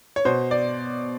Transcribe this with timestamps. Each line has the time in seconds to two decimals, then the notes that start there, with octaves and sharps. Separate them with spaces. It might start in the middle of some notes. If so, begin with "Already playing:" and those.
0.16 C#5
0.25 B2 C5
0.51 D5